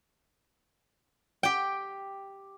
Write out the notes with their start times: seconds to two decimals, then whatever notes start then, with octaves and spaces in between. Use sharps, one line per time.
1.43 G4 G5